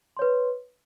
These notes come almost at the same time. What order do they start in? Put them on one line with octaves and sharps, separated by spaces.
C6 C#5 B4